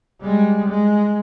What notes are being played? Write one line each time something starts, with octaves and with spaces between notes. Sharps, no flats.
G3 G#3
G#3